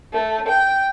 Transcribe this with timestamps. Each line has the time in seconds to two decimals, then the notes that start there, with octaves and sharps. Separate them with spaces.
0.13 A3
0.48 G5